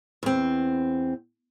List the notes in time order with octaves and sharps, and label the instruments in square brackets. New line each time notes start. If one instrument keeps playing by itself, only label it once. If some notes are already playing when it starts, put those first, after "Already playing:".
[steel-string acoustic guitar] E2 C4